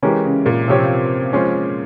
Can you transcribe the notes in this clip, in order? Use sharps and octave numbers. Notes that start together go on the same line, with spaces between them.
E3 G#3 C#4 G4 A#4
C#3
A#2
C3 F3 C4 G4 C#5
F3 G#3 C#4 F4 C5